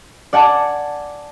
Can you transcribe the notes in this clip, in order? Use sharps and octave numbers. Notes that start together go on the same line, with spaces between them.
D5 F#5 G#5 A5 D6